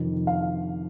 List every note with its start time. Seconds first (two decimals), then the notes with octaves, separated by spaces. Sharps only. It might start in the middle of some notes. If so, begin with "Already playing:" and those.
Already playing: F2 C3 D#3
0.27 F5